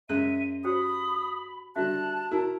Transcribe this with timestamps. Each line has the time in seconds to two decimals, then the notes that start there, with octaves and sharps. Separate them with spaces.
0.09 F#2 G#3 E5 F#6 D#7
0.64 F#4 G4 C5 B5 D#6
1.76 D3 G3 F#4 E5 A5 F#6
2.31 E4 F#4 A#4